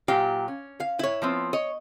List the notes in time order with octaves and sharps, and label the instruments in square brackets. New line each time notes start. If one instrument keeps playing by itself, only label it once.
[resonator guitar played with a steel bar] A#2 F#3 G4 [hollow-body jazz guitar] F5
[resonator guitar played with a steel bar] C#4
[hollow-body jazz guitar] F5
E4 C#5
[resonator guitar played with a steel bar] F3 B3 C4
[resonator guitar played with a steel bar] C#5 [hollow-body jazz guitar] D#5